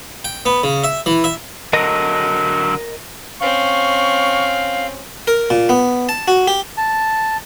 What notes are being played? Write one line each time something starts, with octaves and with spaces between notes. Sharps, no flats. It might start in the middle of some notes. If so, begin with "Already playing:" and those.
G5
B3
C#3
E5
E3
E5
D3 F#3 A#4 D#5
C4 C#4 F5 C#6
A#4
A#2
B3
A5
F#4
G4
A5